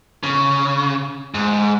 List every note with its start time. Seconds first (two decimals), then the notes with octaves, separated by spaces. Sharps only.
0.23 C#3
1.34 G#2